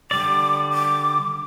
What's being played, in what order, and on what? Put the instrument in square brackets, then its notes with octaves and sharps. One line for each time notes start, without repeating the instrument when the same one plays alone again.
[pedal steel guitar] D3 G3 D5 [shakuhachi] D6
[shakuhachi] D6